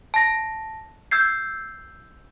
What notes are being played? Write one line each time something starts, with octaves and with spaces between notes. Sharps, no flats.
A5 A#6
E6 G6 G#6 C7